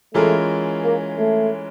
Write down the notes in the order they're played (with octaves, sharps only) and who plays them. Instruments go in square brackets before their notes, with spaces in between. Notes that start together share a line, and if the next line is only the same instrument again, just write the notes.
[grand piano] E3 G#3 C#4 F4 A#4 [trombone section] A3
[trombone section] A#3
A3